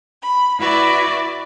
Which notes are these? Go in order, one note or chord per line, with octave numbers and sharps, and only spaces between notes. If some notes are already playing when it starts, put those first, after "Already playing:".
B5
E4 F#4 B4 D5 E5